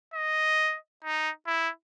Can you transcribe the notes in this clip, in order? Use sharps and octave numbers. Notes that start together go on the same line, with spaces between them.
D#5
D#4
E4